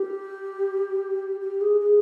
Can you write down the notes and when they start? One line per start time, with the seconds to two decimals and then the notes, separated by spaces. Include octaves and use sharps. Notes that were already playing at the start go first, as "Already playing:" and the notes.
Already playing: G4
1.40 G4
1.61 G#4
1.80 G#4